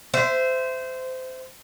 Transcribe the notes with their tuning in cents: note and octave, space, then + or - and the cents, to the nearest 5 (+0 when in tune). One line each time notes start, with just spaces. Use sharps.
C5 -20 E5 +10